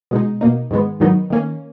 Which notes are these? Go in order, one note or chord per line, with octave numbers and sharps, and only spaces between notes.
B2 G#3 D#4
B2 A#3 D#4
G#2 D#3 G#3 B3
G#2 D#3 F#3 B3 D#4
D#3 A#3 C#4